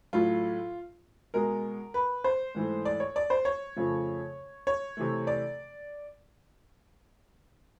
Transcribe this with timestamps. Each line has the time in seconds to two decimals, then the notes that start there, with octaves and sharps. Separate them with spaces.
0.13 A2 F#3 A3 F4
1.34 B2 G#3 A#4
1.94 B4
2.24 C5
2.55 G#2 E3 A3
2.85 D5
3.00 C#5
3.16 D5
3.30 C5
3.45 C#5
3.76 F2 C#3 F3 A3
4.67 C#5
4.97 C3 E3 A3
5.27 D5